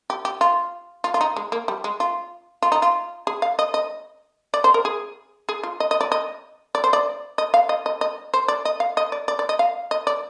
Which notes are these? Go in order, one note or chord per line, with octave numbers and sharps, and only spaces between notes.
G4
G4
F4
F4
F4
D#4
G#3
A#3
G3
G#3
F4
F4
D#4
F4
G#4
F5
D#5
D#5
D5
C5
A#4
G#4
G#4
F4
D#5
D#5
D5
D#5
D5
C5
D5
D#5
F5
D#5
D#5
D#5
C5
D5
D#5
F5
D#5
D5
D5
D5
D#5
F5
D#5
D5